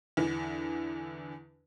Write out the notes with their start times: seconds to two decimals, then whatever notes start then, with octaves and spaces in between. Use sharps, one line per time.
0.17 E2 D3 E3